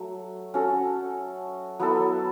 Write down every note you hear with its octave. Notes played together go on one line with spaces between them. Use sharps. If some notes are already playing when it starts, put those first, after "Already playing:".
Already playing: F#3 A3
C#4 F#4 A4
F#3 B3 E4 A4